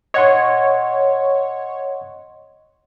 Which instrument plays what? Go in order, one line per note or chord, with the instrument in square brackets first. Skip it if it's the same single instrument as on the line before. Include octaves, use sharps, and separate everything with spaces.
[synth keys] C#5 [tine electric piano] D#5 F#5 C6